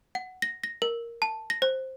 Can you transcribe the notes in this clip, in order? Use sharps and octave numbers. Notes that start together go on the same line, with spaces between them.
F#5
A#6
A#6
A#4
A5
A#6
C5